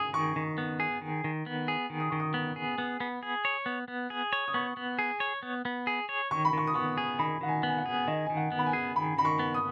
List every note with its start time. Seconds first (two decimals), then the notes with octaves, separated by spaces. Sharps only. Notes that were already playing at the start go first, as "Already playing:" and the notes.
Already playing: G#4 D#6
0.13 D#3 C#6
0.36 D#3
0.58 B3
0.80 G#4
1.02 D#3
1.24 D#3
1.46 B3
1.68 G#4
1.90 D#3
2.00 D#6
2.10 D#3 C#6
2.20 D#6
2.34 B3
2.56 G#4
2.78 B3
3.00 B3
3.23 G#4
3.45 C#5
3.66 B3
3.88 B3
4.10 G#4
4.33 C#5
4.48 D#6
4.54 B3 C#6
4.77 B3
4.99 G#4
5.20 C#5
5.43 B3
5.65 B3
5.87 G#4
6.09 C#5
6.31 D#3 C#6
6.45 B5
6.53 D#3 C#6
6.67 D#6
6.75 B3 C#6
6.98 G#4
7.19 D#3 B5
7.41 D#3 F#5
7.48 G#5
7.63 B3
7.68 G#5
7.78 F#5
7.86 G#4
8.08 D#3 D#5
8.26 D#3 G#5
8.37 F#5
8.52 B3
8.59 B5
8.66 G#5
8.73 G#4
8.96 D#3 B5
9.18 D#3 B5
9.25 C#6
9.39 B3
9.54 D#6